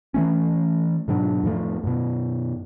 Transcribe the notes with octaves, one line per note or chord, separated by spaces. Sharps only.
E3 A3 C#4
G#2 B2 F#3 D4
F2 A2 F3 A3
F#2 B2